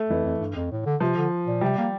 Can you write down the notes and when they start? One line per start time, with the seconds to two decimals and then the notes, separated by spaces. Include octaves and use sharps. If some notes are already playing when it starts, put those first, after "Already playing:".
Already playing: A3
0.10 F2 E3
0.24 F2
0.40 G2
0.56 F2
0.71 A2
0.86 D3
1.00 C3 F3
1.16 D3
1.47 A#2
1.61 C3 G3
1.78 A#3